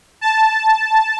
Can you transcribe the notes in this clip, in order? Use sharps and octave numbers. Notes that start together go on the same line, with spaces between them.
A5